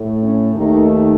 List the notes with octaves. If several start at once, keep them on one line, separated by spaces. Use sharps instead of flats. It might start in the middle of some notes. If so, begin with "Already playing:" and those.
Already playing: A2 A3
C#4
D#2 D#3 A3 D#4